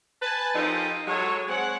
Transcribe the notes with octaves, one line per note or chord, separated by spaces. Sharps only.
B4 G#5 A5
F3 D#4 F4 G4 A4 A#4
F#3 G#3 A4 C#5
G#3 C4 C#5 F#5